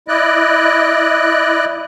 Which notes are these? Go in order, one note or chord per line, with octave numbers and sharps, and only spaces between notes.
E4 D5 D#5 F#6